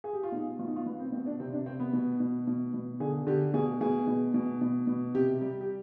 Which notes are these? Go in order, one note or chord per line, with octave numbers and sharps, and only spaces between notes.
G#4
G4
F4
B2 D#4
B2 F4
D#4
F4
B2 B3
C4
B2 C4
D4
C3 C4
D4
C3 C4
B3
B2
B2
B2
B2
D3 G#4
D3 G4
B2 G#4
B2 G#4
B2
B2
B2
B2
C3 G4
G3 G4
G4